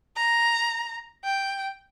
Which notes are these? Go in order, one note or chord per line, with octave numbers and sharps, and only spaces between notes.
A#5
G5